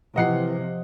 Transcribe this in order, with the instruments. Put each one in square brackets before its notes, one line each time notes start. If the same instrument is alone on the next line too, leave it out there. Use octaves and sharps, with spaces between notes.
[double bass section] C3 [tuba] E3 [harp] F3 [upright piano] D#5 F#5 C7